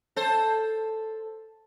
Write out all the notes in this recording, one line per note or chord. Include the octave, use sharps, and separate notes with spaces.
A4 C5